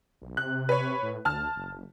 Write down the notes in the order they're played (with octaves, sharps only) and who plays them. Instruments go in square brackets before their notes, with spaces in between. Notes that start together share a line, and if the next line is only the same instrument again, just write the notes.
[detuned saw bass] B1
[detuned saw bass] C3 [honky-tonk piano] F#6
[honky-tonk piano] B4 C#5
[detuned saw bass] A2
[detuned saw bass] D2 [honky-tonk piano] A5 F6
[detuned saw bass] F#1